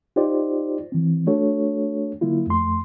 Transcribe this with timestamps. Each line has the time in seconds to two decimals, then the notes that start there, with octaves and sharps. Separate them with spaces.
0.16 D#4 F4 G4 C5 D5
0.92 E3 C4
1.27 A3 D4 F#4 A4 C#5
2.21 D3 F#3 A#3 E4 F4
2.47 F2 A3 C6